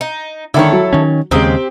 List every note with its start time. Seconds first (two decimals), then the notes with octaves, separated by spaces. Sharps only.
0.01 D#4
0.54 D3 D#3 E4 A4 C#5
0.72 F#3
0.93 D#3 C#4
1.31 D#2 C#3 G#3 C4 G4 A#5 D#6